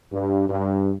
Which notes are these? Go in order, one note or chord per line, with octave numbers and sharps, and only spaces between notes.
G2
G2